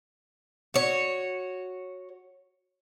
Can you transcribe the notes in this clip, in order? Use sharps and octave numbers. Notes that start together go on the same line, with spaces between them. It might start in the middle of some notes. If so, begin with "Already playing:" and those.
F#4 C#5